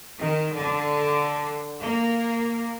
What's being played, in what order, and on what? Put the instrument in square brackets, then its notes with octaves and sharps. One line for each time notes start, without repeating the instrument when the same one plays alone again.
[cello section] D#3
D3
A#3